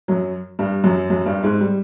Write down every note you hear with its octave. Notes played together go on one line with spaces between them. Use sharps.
F#2 F#3
G2 G3
F#2 F#3
F#2 F#3
G2 G3
G#2 G#3
G3